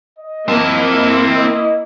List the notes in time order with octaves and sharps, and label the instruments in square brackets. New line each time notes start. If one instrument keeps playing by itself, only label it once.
[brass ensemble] D#5
[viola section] A#3 E4 [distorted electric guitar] C4 A5
[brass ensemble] D#5